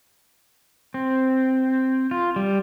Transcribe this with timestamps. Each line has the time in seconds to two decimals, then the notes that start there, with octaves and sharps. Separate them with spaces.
0.94 C4
2.11 F4
2.36 G3